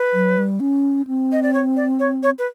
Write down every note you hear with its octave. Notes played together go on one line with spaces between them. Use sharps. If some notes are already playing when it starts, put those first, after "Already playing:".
Already playing: B4
F#3
G3
C#4
C4
D#5
D5
C#5
D5
C#5
C#5
B4